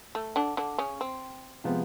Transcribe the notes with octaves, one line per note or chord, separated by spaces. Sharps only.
A3
D3 D4
D3 D4
C#3 C#4
C4
C3 F3 G#3 B3